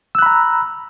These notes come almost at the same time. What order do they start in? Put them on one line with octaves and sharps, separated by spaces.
E6 F#6 B5 A#5